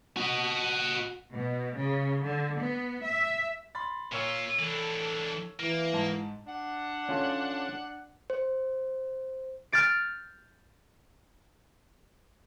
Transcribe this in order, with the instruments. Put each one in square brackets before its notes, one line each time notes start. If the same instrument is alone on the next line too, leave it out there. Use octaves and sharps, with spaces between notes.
[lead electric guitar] F#4 D#5
[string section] B2
C#3
D3
B3
E5
[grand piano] B5 C6 A6
[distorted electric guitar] A#2 F4 [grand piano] A#4 C#5 E6
[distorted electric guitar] E3 D4 [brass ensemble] A4
[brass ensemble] E3 [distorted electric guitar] A#3
[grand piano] G#2 A5
[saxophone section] D4 F#5
[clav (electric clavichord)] C#4 F4 A4
[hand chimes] C5
[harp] F6 G6 A6 D7